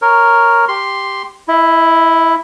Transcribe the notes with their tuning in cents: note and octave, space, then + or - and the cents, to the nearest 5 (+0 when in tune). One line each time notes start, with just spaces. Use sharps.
A#4 +0 C#5 +0
G4 +0 C6 +0
E4 +0 D#5 +45